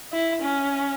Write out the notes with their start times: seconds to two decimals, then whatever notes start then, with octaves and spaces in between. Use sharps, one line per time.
0.13 E4
0.42 C#4